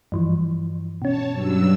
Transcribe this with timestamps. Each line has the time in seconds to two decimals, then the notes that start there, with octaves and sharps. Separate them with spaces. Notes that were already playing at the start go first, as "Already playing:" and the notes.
0.12 G2 E3 F3
1.02 B2 C#4 C#5 A5
1.31 G2 F#3 E6